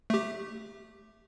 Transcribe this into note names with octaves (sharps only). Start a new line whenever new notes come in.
A3 G4